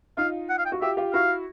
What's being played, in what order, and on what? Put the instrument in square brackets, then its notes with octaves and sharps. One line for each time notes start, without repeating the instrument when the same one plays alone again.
[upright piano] D#4 F4 [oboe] F5
[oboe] F#5
F5
G5
[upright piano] F#4
[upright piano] F4 G4 [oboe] E5
[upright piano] F4 G4
[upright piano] E4 F#4 [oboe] F5